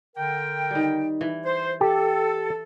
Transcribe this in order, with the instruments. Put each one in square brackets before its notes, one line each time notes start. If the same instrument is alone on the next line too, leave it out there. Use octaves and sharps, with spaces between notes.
[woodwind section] D3 A#4 G5
[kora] D#3 G3
E3
[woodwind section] C5
[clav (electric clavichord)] G4 [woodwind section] A4